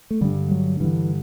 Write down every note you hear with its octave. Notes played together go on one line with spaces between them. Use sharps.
A3
G2 D3 G3
F#3
G2 D3 E3